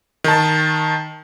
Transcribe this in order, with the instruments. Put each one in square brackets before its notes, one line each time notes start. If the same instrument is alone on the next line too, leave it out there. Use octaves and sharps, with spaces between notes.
[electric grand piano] D#3 A5